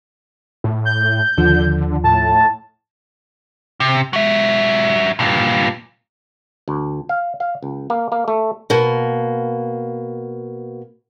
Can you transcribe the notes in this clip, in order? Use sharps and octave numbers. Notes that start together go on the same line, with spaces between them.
A2
G6
D#2 D3 F3
A2 A5
C3
F#3 E5
G2 A#2
D2
F5
F5
C#2
A#3
A#3
A3
B2 A#3